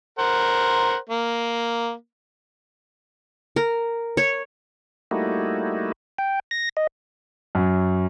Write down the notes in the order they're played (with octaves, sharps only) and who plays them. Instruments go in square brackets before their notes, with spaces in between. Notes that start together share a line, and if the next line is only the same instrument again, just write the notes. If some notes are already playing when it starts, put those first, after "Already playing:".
[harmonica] A#4 C5 F#5
A#3
[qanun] A#4
C#5
[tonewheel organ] G3 A3 A#3 D#4 E4 F#4
G5
A#6
D#5
[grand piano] F#2